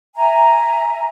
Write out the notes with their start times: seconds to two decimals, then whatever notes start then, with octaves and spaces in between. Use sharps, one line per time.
0.16 E5 G#5 A#5